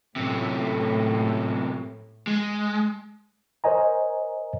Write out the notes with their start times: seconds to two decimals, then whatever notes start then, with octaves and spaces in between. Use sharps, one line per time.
0.16 F#2 A2 C3
2.27 G#3
3.64 A#4 C5 C#5 D#5 G#5 A#5